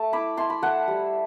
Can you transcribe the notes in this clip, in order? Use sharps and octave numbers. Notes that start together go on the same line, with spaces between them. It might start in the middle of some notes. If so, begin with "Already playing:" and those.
Already playing: A3 A5
E4 B5 D6
E4 A5 C6
B5
A3 F#5 A5
G3